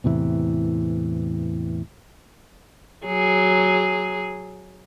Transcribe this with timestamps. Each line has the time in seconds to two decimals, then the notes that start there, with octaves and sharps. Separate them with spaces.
0.04 E2 A2 C3 E3
3.06 F#3 G#4